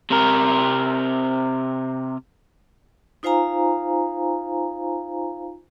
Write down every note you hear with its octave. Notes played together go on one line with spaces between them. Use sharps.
C3 A#4
D#4 F4 C5 F5 G#5 A#5